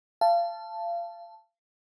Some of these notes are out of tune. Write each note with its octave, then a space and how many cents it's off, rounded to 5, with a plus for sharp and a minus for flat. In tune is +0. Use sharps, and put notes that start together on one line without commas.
F5 -30 A5 +0